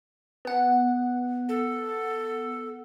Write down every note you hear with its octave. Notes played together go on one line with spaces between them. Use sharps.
B3 F#5
A4